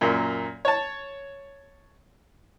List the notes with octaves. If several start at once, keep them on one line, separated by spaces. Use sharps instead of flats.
F#2 A#2
C#5 A5